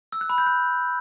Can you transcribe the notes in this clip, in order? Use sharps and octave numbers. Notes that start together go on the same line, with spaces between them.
E6
F#6
B5
G6
F#6